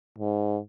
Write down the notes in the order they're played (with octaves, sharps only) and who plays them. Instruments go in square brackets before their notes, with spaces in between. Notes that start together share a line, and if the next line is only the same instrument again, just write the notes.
[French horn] G#2